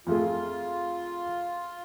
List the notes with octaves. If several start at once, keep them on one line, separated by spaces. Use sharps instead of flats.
F2 A3 F4 G#4